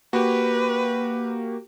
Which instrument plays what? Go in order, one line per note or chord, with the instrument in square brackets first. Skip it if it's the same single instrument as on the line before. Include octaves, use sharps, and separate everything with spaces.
[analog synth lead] A#3 [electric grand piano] F#4 G4 [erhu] B4